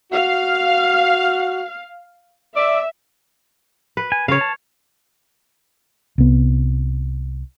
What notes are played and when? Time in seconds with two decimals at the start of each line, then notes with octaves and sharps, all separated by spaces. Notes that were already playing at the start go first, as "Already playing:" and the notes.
0.12 F#4 F5
2.56 D5 E5
3.97 B4
4.12 G#5
4.28 C#3 C#5 F5
4.41 A5
6.18 C2 B3